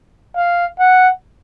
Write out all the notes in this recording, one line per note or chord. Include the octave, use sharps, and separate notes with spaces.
F5
F#5